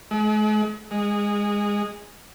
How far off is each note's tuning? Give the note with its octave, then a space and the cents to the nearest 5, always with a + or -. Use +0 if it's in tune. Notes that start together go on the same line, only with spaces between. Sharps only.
G#3 +45
G#3 -15